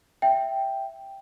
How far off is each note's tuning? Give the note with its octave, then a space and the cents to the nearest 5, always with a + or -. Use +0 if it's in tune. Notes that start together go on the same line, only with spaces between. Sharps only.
E5 +0 G5 +0